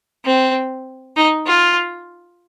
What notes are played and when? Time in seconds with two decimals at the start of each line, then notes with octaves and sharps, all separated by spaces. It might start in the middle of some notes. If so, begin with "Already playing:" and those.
0.25 C4
1.16 D#4
1.47 F4